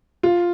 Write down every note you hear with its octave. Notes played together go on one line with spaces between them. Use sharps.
F4